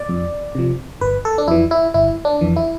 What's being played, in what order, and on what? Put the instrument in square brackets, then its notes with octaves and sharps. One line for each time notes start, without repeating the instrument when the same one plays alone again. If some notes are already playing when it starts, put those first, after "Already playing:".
Already playing: [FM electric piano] D5
F2
C3 F3
G1 B4
A4
D4
F2 E3 E4
E4
G1 E4
D4
F2 E3
E4